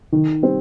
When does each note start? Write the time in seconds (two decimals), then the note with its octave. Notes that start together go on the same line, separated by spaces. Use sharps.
0.12 D#3
0.42 G3 C4